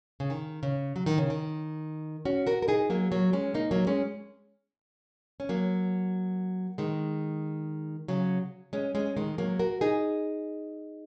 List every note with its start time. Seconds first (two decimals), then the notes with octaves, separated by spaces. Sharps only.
0.20 C#3
0.30 D#3
0.63 C#3
0.96 F#3
1.06 D#3
1.18 C#3
1.30 D#3
2.25 C#4 F#4
2.47 F#4 A#4
2.62 A#4
2.68 D#4 G#4
2.90 F#3 A#3
3.12 F#3 A#3
3.33 G#3 C#4
3.54 A#3 D#4
3.71 F#3 A#3
3.87 G#3 C#4
5.40 C#4
5.49 F#3 A#3
6.78 D#3 G#3
8.08 C#3 F#3
8.73 G#3 C#4
8.95 G#3 C#4
9.17 D#3 G#3
9.38 F#3 A#3
9.59 F#4 A#4
9.81 D#4 G#4